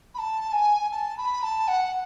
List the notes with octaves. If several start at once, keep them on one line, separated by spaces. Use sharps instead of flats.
B5
A5
G#5
A5
B5
A5
F#5